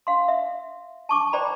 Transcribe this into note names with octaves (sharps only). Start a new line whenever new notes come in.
F5 C6
E5
A5 C#6 D6
C5 D5 G5 A#5 B5